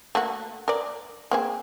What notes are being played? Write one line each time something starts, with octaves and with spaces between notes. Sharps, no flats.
A3 A#3 F#4
A#4 D5
A#3 C4 G#4